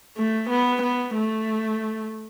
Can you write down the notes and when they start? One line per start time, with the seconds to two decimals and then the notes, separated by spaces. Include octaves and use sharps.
0.17 A3
0.50 B3
0.82 B3
1.14 A3